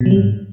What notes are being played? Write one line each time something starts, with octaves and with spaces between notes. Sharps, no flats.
B2
F#3
G3
G#2